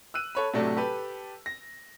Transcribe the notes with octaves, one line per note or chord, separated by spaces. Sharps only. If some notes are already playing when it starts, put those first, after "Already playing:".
E6 F#6 D#7
A4 C#5 B5
A2 C3 F#3 A3 D4
G4 A4 B4
A#6